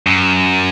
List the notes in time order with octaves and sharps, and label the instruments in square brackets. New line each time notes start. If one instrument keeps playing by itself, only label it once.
[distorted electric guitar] F#2